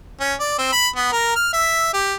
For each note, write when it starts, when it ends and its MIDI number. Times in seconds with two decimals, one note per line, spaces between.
0.20 0.34 61
0.40 0.56 74
0.58 0.69 60
0.72 0.87 83
0.96 1.11 59
1.12 1.34 70
1.35 1.49 89
1.53 1.91 76
1.94 2.15 67